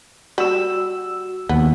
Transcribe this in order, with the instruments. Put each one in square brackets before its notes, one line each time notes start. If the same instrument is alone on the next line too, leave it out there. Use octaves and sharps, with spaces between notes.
[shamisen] G3 [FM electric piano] F#4 E6
[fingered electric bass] D#2 [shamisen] B3